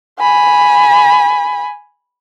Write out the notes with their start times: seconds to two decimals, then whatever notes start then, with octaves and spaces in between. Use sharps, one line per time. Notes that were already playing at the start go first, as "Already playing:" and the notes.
0.19 G#5 B5